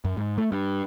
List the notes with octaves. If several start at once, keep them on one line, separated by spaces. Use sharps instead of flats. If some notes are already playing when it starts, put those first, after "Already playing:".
F#2
G#2
A3
G2